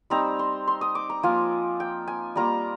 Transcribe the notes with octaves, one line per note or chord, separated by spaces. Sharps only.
G3 C4 D#4 A#5
C6
C6
D#6
D6
A#5
F3 A#3 F4 G#5
G5
G#5
G3 A#3 F4 A#5